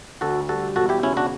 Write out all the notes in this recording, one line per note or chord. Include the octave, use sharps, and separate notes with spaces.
D2 F#4 A4
G3 F#4 A4
E1 F#4 A4
E4 G4
C#3 C#4 E4
D4 F#4